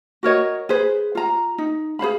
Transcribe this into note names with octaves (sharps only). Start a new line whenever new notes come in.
F#4 A#4 C#5 D#5
G#4 B4 C5
F4 A#5
D#4
G#4 C5 F5 B5